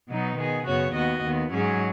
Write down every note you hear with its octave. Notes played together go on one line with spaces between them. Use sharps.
B2 F#3 B3 D#4
D#3 B3 G#4
F#2 C#3 B3 F#4 C#5
D#2 D#3 B3 F#4 D#5
D#2 D#3 B3
G#2 F#3 C#4 G#4